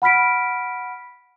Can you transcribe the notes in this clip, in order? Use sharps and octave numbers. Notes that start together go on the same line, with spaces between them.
F#5 B5 F6 B6 D7